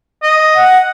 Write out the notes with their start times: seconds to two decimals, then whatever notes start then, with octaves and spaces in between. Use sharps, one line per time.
0.23 D#5
0.55 F#5